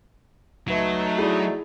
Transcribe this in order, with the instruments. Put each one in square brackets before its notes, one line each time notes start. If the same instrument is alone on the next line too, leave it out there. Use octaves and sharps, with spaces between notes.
[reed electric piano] C#2 B4 E5 [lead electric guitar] F#3 [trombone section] A3 D#4
[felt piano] E4 G#4 [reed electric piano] F#4 D5